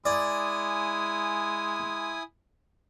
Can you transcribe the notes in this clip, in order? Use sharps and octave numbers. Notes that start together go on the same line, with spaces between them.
G#3 E4 D5 G#5 D#6